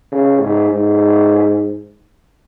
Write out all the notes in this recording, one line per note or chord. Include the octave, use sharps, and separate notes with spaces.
C#3
G#2
G#2